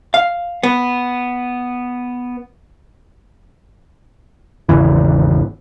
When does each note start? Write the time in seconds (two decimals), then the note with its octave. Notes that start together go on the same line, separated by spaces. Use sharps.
0.14 F5
0.63 B3
4.69 G#1 E2 C#3 E3